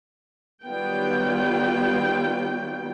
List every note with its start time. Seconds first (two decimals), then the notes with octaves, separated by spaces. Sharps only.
0.67 D#3 F#3 G3 B3 F4 G5